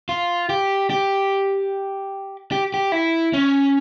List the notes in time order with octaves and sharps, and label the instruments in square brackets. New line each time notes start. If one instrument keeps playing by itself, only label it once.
[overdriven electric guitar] F4
G4
G4
G4
G4
E4
C#4